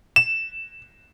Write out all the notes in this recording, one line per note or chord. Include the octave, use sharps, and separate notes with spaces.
E7